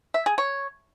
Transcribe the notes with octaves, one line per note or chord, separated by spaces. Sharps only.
E5
G#4
C#5